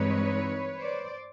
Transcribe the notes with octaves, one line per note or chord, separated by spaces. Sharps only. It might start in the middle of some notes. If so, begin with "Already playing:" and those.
Already playing: G2 E3 G#3 C4 D#4 B4 C#5
C5 D5